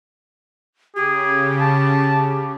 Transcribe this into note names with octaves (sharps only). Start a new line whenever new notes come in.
C#3 G4 G#4
A5